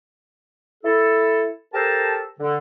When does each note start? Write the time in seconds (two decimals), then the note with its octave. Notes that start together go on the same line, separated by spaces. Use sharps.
0.84 E4 A4
1.74 G4 A4 A#4 C5 A5
2.39 D3